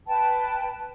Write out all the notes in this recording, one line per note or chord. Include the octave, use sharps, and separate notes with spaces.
B4 G5 A5